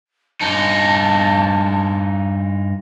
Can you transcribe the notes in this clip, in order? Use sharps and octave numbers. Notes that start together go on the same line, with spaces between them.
G2 D#4 A5